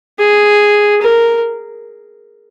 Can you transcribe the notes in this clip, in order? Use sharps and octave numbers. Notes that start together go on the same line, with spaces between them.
G#4
A#4